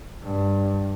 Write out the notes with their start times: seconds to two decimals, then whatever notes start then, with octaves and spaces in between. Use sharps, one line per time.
0.22 G2